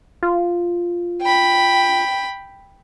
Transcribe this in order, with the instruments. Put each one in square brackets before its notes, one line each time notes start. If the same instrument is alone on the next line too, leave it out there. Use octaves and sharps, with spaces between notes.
[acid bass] F4
[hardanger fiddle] G5 B5